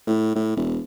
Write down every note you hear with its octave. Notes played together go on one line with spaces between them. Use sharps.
A2
A2
E1